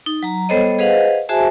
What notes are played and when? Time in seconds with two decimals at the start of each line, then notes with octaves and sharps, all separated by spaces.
0.06 D#4
0.23 F#3 A#5
0.49 G3 B3 A4 C5 C#5 D#5
0.79 G#4 B4 C5 D#5 F5 F#5
1.29 F#4 G#4 C5 E5 G#5 A5